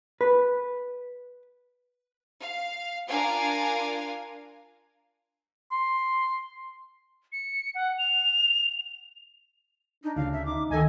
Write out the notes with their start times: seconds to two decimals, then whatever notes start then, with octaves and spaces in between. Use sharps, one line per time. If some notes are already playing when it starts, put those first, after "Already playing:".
0.21 B4
2.40 F5
3.07 D4 F4 A#4 F5 G#5
5.72 C6
7.32 C#7
7.75 F#5
7.98 F7
10.04 D4 D#4
10.16 D2 C#3 F5
10.33 E5
10.46 D#4 D6
10.70 D2 D#3 A4 D#5 G#5